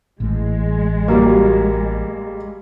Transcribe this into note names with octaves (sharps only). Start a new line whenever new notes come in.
A1 A2 E3 G#3
F#3 G3 A#3